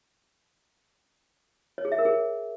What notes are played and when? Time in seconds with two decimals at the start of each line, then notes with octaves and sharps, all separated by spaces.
1.78 C#5
1.85 G#4
1.92 E5
1.98 A#4
2.05 G#4